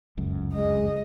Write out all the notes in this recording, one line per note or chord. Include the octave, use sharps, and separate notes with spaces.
F1 C#2 F#2
G#3 D#5